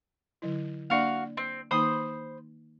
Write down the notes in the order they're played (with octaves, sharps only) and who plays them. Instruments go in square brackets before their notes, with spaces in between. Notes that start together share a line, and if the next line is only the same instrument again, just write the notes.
[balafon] D3 F#3 E4
[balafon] A#3 D4 D5 [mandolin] F#4 F5
[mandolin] C4
[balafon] D#3 A#3 D#4 [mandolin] C5 B5 D#6